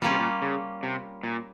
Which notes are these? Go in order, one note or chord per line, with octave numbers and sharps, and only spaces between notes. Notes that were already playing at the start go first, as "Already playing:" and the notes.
A#2 G3 A#3 C#4 F4
C3
A#2
C#3
C3
A#2